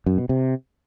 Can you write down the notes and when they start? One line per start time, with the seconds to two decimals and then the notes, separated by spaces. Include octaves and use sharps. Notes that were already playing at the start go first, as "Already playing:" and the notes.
0.06 F#2
0.18 B2
0.29 C3